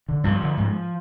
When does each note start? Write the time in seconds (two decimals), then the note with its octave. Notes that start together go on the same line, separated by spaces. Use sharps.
0.09 D3
0.24 G2 F3
0.41 D3
0.57 G#2